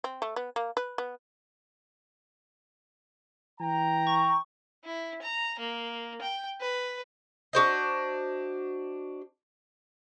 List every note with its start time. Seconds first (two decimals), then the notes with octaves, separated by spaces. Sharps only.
0.04 C4
0.22 A3
0.36 B3
0.56 A#3
0.77 B4
0.98 B3
3.60 E3 G5 A#5
4.07 C#6
4.84 E4
5.22 A#5
5.59 A#3
6.21 G5
6.60 B4
7.53 D4 F#4 C5 D#5